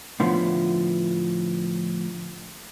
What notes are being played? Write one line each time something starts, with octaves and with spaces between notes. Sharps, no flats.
A2 D3 F3 B3